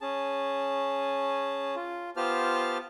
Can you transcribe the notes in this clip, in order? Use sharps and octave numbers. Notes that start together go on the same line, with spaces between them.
C#4 G#4 A5
F4
B3 F4 G4 C5 A5 F6